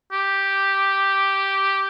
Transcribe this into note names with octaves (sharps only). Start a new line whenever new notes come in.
G4